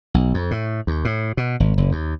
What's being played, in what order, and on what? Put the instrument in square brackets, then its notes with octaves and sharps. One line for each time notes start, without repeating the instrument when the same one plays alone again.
[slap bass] B1
F2
A2
D#2
A2
B2
G#1
F#1
D#2